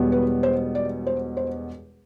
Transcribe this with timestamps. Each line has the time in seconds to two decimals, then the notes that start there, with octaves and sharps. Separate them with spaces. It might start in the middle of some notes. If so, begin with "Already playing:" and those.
Already playing: E1 E2 B2 G3 B3
0.12 B4
0.43 C5
0.75 D5
1.07 C5
1.37 C5